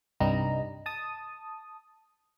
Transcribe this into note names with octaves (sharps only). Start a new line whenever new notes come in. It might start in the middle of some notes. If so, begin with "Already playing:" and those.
C2 G2 G3 D#4 A#5
A5 D#6